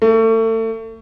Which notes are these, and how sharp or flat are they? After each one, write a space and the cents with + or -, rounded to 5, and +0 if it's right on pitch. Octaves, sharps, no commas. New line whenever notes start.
A3 +35